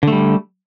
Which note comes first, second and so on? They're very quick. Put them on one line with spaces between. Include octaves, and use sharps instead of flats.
D3 A3 G3